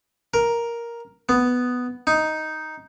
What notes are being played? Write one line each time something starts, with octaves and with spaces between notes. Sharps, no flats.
A#4
B3
D#4